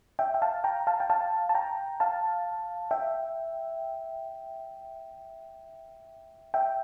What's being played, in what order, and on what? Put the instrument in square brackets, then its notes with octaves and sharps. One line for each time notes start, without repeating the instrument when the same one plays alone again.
[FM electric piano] E5 G5
G5
F5 A5
G5 A#5
F5 A5
G5
F5 A5
A5
G5 A#5
F5 A5
E5 G5
E5 G5